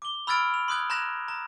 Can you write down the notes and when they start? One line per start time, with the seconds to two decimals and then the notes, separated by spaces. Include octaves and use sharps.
0.02 D6 G7
0.27 B5 E6 F6 G#6 A6 D7
0.54 F7
0.68 C6 D#6 F#6 G#6
0.90 A#5 C6 F#6 G#6 A#6 F7
1.28 A#5